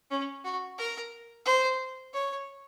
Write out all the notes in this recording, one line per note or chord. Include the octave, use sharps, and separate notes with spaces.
C#4
F#4
A#4
C5
C#5